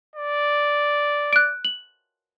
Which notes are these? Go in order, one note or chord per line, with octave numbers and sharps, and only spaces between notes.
D5
F#6 D7
F#7